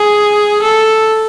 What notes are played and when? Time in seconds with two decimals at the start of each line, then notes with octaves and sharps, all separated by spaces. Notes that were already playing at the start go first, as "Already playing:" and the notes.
Already playing: G#4
0.62 A4